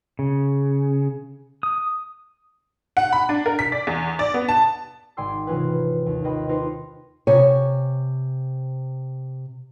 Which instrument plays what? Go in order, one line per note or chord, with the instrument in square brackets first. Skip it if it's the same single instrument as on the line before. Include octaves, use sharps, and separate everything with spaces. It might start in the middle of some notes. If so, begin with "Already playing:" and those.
[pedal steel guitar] C#3
D#6
[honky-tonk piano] F#5
B5
D4
A#4
B6
D5
E2
D5
B3
A5
[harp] G#1 G#4 D5 G5 C6 E6
C3 E3 C#4 F4 G#4 B4
D#2
F4 B4 D#5 G5 B5
D#4 F4 G4 B4 C5 D#5
[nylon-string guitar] C3 C#5 G#5